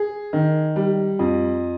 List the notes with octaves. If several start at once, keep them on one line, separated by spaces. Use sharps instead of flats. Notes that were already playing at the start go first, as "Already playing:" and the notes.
Already playing: G#4
D#3
G3
F2